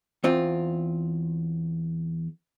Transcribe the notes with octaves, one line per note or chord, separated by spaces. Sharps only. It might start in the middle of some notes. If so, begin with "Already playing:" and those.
E2 C4 F4